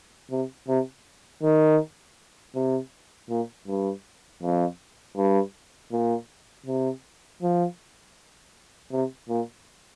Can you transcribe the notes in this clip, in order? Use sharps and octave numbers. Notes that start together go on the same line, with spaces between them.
C3
C3
D#3
C3
A#2
G2
F2
G2
A#2
C3
F3
C3
A#2